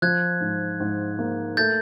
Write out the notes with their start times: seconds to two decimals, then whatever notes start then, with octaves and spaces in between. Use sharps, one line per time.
0.02 F3 F#6 G#6
0.41 G#2
0.80 G#2
1.19 A#3
1.57 A3 G6 A6